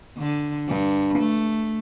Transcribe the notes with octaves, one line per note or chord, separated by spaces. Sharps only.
D3
G2
A3